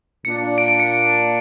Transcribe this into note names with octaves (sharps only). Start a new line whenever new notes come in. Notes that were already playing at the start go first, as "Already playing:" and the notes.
A#2 A#3 D4 C#7
D7
D7
C#7